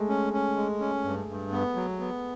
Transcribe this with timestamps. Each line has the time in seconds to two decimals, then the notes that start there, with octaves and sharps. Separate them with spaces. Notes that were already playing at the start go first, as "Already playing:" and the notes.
Already playing: G#3 A3
0.09 C#4
0.33 C#4
0.57 G#3
0.80 C#4
1.04 G2
1.29 G2
1.52 B3
1.76 F#3
1.99 B3